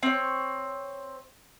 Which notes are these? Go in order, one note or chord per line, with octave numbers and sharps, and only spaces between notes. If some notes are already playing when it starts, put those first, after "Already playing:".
C4 C#5